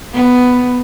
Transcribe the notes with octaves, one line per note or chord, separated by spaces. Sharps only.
B3